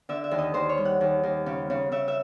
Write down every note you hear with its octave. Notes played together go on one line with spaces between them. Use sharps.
D3 E5
E5
D#2
D#5
D#2 C5
C#5
G3
F#5
D#2
D#2
C#3
C#3
C#3 E5
E5